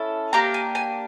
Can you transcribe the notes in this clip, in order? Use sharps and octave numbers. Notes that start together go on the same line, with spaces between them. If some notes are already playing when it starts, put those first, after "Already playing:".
Already playing: C#4 E4 A4
A#3 D4 G4 A#5
G#5
G#5